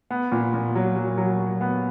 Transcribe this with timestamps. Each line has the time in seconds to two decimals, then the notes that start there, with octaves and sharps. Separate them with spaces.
0.11 B3
0.32 A#2
0.54 A#2
0.75 F#3
0.96 F#3
1.18 F#3
1.40 F#3
1.61 B3